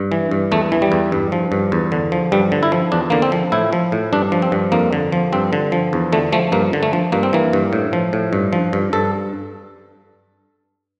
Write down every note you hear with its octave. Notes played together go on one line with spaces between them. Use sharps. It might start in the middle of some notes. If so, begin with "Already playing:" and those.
Already playing: G2
E3
G2
E2 A3
E3
G3
E2
G2
F3
G2
E2
D3
F3
G2 G3
D3
E4
F3
E2 D4
D3 A#3
C4
F3
A2 E4
F3
A2
G2 D4
F3
C4
G2
F2 A#3
D3
F3
G2 C4
D3
F3
E2
D3 A3
F3 A3
G2 A#3
D3
A3
F3
G2 A#3
C4
E3 A#3
G2
A2
F3
A2
G2
F3
G2
G2 A4